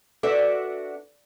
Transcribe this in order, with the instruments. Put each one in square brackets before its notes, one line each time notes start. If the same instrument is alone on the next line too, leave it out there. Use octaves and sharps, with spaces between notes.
[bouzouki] D4 F#4 E5 [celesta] A4 B4